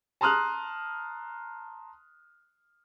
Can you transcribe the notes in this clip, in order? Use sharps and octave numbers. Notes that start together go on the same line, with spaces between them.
A5 A#5 C6 D#6 F6 F#6